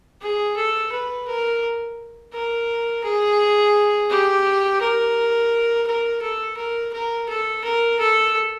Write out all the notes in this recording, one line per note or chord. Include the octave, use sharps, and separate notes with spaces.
G#4
A4
B4
A#4
A#4
G#4
G4
A#4
A#4
A4
A#4
A#4
A4
A#4
A4